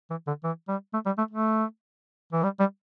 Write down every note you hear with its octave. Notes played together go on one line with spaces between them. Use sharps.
E3
D3
E3
G3
A3
G3
A3
A3
E3
G3
G3